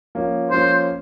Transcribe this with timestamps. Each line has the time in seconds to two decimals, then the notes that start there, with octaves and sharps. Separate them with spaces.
0.15 F3 A#3 C#4
0.50 F3 A#3 C#4 C5